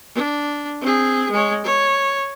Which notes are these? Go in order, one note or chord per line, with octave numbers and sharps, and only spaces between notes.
D4
C4 G#4
G#3 C#5
C#5